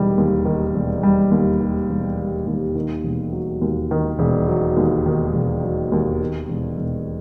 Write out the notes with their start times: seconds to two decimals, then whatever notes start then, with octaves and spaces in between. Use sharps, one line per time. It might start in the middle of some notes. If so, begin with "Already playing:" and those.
Already playing: E1 D#3 G3
0.18 D#2
0.45 D#3
0.74 E1
1.03 G3
1.31 D#2
1.60 D#3
1.90 E1
2.19 G3
2.47 D#2
2.75 D#3
3.04 E1
3.33 F#3
3.61 D#2
3.91 D#3
4.19 E1
4.48 F#3
4.77 D#2
5.06 D#3
5.34 E1
5.63 F#3
5.92 D#2
6.21 D#3
6.48 E1
6.78 E1